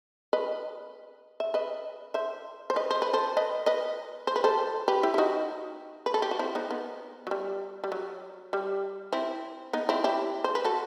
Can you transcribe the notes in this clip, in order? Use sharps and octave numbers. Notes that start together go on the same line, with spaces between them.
B4 D#5
E5
B4 D#5
C5 E5
C5
B4 D#5
C5
B4
A4 C5
B4 D#5
B4 D#5
C5
B4
A4 C5
G4 B4
E4 G4
E4
D#4 F#4
B4
A4
G4
F#4
C4 E4
B3 D#4
B3
F#3
G3
G3
F#3
G3
C4 E4
B3 D#4
C4 E4
E4 G4
C5
B4
F#4 A4